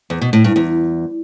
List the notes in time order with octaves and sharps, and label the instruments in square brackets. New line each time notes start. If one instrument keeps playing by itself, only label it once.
[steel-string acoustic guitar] E2
B2
A2
G2
E2